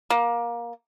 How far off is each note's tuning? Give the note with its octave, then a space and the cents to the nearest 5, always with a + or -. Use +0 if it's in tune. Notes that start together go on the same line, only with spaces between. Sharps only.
A#3 +20